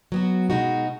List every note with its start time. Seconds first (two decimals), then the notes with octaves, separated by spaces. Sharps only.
0.12 F#3 B3 F#4
0.50 B2 G#3 D#4 F#4